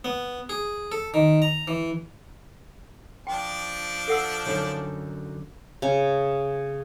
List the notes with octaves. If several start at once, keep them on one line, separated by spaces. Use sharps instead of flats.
B3
G#4
A4
D#3
A#5
E3
F3 D4 G5 A5
A4 F#5 E6
F#2 D3 D#4 C#5
C#3